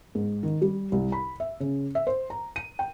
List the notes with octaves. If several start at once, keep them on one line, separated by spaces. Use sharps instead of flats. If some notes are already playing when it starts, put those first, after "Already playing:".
G#2
D#3
G3
C2
B5
E5
C#3
E5
C5
A#5
D#7
G5